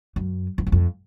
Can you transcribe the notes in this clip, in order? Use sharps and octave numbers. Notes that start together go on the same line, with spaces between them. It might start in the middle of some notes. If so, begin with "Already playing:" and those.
F#2
F2
F#2
F2